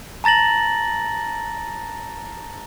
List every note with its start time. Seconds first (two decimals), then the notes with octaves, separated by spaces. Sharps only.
0.24 A5 A#5 A6 A#6 F#7